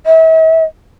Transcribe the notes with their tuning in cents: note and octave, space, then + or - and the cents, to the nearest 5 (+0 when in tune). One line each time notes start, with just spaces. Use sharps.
E5 -40